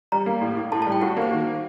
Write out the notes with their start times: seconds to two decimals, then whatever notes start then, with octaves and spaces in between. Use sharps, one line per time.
0.12 G3 A#5
0.26 A#3
0.41 A2
0.57 A2
0.72 A2 A5
0.82 A5
0.87 G3
0.92 G5
1.02 F#4 F#5
1.17 A#3
1.22 C5
1.33 D#3